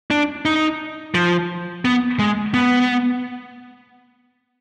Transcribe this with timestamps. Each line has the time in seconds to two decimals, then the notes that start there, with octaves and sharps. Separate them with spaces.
0.11 D4
0.45 D#4
1.14 F3
1.85 B3
2.19 G#3
2.54 B3